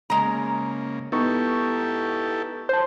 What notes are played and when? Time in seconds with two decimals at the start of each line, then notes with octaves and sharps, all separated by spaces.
0.10 C#3 G#3 A#3 A#5
1.12 B3 D#4 E4 G4 A4 C#6
2.69 C5 A5 G6